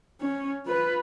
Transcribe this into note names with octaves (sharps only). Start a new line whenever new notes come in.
C#4
F4 B4